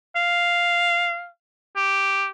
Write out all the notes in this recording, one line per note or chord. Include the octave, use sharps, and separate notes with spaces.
F5
G4